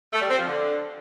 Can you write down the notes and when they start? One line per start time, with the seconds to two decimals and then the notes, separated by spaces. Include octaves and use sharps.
0.13 A3
0.21 G3
0.30 C4
0.38 F3
0.47 D3